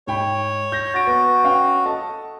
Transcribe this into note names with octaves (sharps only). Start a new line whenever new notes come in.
G#2 C#5 G5 B5
G6 A#6
F#4 A6 A#6 D7
B3
C#4 F5 G5
A4 D#5 A5